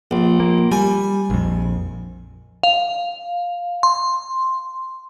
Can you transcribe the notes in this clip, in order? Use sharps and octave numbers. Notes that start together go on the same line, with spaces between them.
A#1
A#3
G3 G#5
A#1 F2
F5
C6